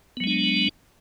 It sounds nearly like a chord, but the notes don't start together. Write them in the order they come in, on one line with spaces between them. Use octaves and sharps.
B3 F#3 G#3 D4